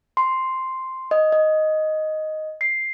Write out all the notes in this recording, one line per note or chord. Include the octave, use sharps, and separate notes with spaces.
C6
D#5
D#5
C7